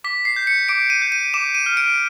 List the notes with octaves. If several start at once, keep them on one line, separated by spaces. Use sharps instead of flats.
D6 B6
C7
G6
C#7
D6 D7
D#7
G6
D#7
D6 E7
D#7
F6
D7